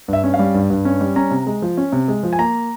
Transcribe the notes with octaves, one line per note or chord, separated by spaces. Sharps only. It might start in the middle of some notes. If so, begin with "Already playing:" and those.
G2 E5
C#4
F5
G3
G2
G2
C#4
G3
C#4 A#5
C3
G#3
F3
C#4
C3
G#3
F3
G#5
A#3 A#5